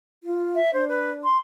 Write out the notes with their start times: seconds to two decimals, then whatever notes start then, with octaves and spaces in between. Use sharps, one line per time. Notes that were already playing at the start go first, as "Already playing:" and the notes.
0.24 F4
0.55 E5
0.74 D4 C5
0.89 B4
1.24 C6